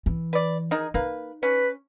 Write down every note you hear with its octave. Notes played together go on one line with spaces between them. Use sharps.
E3
B4 D5
D#3 D#4 G#4
A#3 D#4 B4
C#4 B4